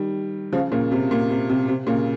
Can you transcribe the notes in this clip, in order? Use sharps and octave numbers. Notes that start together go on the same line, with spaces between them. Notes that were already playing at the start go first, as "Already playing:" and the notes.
Already playing: D#3 G3
C#3 F3
A#2 C#3
C3
A#2
C3
C3
C3
A#2 C#3